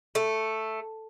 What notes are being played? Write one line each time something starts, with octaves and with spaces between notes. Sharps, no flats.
A3